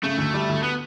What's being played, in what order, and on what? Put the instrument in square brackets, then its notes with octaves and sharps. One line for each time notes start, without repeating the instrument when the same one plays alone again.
[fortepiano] C#3 [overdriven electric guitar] A3
[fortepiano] D2
G3
D2
[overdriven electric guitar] B3